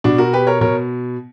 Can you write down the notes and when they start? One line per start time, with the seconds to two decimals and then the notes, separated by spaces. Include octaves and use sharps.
0.04 B2 D4 F#4
0.18 F#4 A#4
0.33 G4 B4
0.47 A#4 C#5
0.61 B2 A#4 C#5